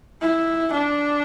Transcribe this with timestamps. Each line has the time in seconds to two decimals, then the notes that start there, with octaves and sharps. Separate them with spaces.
0.22 E4
0.73 D4